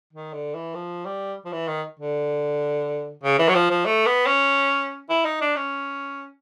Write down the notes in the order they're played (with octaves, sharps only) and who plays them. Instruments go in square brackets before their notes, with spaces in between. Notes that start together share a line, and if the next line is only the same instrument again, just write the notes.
[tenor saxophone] D#3
D3
E3
F3
G3
F3
E3
D#3
D3
C#3
E3
F#3
F3
F3
A3
B3
C#4
E4
D#4
D4
C#4